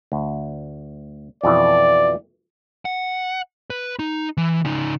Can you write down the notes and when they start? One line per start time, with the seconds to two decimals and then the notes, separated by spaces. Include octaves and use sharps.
0.12 D2
1.44 F2 B2 E3 D5
2.85 F#5
3.70 B4
3.99 D#4
4.37 E3
4.65 C#3 D#4